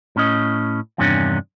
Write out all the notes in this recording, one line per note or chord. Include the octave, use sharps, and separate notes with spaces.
A2 C#4 D#5
E2 G2 C3 D#3 C#4 D4